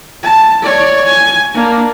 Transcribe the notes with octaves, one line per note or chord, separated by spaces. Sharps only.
A5
C#5 D5
G#5
A#3 D4